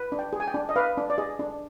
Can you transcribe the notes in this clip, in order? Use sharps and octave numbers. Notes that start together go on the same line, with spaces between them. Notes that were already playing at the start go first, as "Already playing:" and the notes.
Already playing: B4
D4
G5
G#4
G#5
G5
D4
D#5
B4 F5
D4
D5
G#4 D#5
D4